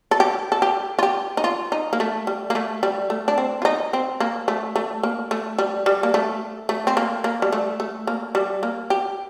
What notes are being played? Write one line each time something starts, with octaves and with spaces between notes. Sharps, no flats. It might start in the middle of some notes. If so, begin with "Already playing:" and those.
A4
G4
A4
G4
F4
G4
D#4
F4
D#4
A#3
A3
G3
A#3
A3
G3
A3
D4
C4
F4
D#4
C4
A#3
A3
A3
A#3
A3
G3
G3
A#3
A3
A3
C4
A#3
A#3
G3
A3
A3
A#3
G3
A#3
G4